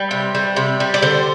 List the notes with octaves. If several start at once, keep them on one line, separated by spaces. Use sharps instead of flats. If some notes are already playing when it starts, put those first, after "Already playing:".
Already playing: G3 B4
C3
G3
C3
G3
D5
D3 C5